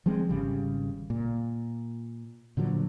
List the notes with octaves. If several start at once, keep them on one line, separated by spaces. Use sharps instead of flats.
F3 G3 G#3 C4
G#1 C#3 G3
A#2
A#2 D3 F3 F#3